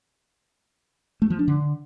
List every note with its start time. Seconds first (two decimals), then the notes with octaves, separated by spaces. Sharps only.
1.22 A3
1.30 F3
1.39 D4
1.48 D3